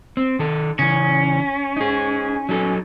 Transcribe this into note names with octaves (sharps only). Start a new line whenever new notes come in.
C4
D#3 A4
C#3 E3 C#4
D#4 G#4
F#3 D#4 A4